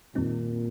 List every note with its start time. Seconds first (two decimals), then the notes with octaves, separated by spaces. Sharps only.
0.15 F2 A#2 D#3 G3 C4 D#4